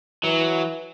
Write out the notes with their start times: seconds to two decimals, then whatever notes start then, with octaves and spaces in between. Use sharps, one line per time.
0.23 E3 F#3